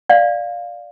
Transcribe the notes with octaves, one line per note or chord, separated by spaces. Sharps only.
D5 F5